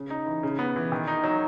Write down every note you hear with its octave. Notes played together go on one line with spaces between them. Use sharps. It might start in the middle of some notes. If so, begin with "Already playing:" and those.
Already playing: C#3
D#4
E3
C#3
B3
E3
D#3
D#4
F#3